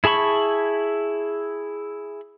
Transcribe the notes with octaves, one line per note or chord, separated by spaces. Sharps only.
E4 G#4 A5 B5 C#6